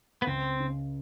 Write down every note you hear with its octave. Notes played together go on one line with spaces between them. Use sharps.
B3
C#2 C4
C#3